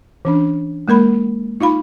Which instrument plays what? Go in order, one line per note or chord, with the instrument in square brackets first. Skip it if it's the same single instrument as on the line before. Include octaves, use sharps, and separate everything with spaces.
[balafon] E3 C#4 D4
G#3 A#3 A#4 B5
D#4 F4 F5 B5